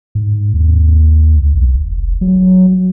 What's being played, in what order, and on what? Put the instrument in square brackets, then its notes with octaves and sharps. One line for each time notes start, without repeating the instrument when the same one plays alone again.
[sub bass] G#2
D#2
C#2
B1
F1
F#3